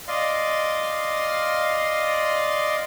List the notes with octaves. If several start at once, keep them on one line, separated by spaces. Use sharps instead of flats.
D5 D#5 F5 C6